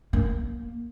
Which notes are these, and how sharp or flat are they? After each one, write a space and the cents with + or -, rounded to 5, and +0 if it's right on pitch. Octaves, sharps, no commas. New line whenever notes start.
A#3 +15